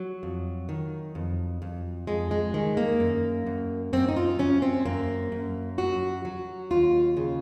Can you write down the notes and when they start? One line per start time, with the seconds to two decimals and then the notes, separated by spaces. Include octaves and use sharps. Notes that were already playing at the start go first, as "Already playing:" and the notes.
Already playing: F#3
0.23 F2
0.69 D#3
1.15 F2
1.62 F2
2.07 F2 G#3
2.31 G#3
2.54 D#3 G#3
2.77 A#3
3.00 F#2
3.46 F#2
3.93 F#2 C4
4.09 D#4
4.16 F4
4.39 F#2 C#4
4.62 C4
4.85 F#2 A#3
5.32 F#2
5.78 F#3 F#4
6.25 F#3
6.71 D#2 F4
7.17 C#3